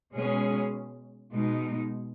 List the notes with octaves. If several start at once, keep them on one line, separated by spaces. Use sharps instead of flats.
B2 G#3 C#4 G#4
B2 G#3 D#4